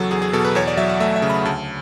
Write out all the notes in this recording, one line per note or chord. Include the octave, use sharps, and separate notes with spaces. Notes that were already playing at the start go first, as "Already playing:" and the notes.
Already playing: E2 C#3 F#3 A4
E2 G#4
G#4
B2 A4
B4
E2 C#5
D5
F#3 E5
F#5
A3 E5
E5
C#3
B5
D2 A5